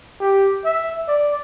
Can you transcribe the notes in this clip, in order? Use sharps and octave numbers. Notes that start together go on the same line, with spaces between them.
G4
E5
D5